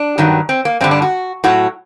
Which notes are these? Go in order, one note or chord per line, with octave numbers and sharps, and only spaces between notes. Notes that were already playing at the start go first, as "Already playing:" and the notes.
Already playing: D4
G2 D#3 F#3
C4
A#3
G2 D3 G3 C4
D4
F#4
A2 F#3 F#4